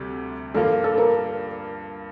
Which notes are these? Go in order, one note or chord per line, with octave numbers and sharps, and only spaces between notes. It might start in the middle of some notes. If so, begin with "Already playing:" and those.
Already playing: D2 C3 G3
G2 F3 A#3 F4 A4
A4
A#4